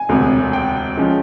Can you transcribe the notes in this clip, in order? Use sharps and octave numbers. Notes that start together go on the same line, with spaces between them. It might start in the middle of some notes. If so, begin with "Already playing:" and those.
Already playing: G#5
E1 D2 C3
G5
F3 G#3 C#4